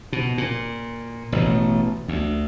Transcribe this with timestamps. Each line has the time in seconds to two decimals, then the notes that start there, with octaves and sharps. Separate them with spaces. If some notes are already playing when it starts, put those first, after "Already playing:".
0.13 B2
0.38 A#2
1.32 A1 B2 A3
2.08 D2